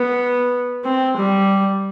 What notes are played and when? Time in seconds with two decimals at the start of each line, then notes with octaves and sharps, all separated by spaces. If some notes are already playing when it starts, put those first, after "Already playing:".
Already playing: B3
0.84 C4
1.17 G3